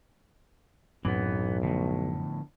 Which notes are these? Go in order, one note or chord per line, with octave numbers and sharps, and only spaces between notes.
B1 F#2 A2 E3 B3 C4
A2 D3 F3 B3